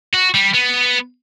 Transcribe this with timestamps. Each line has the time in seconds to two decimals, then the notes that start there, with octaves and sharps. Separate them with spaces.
0.14 F#4
0.34 G3
0.54 B3